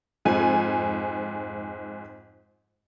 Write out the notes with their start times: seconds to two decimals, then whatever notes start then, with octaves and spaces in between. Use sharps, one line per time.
0.25 F2 G#2 G#5